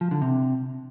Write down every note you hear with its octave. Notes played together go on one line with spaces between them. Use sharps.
F3
D3
C3